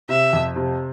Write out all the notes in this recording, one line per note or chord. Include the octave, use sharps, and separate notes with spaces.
C3 E5
F2
C3